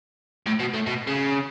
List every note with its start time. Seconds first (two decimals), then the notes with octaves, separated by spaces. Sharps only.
0.47 A2
0.60 B2
0.74 A2
0.87 B2
1.07 C#3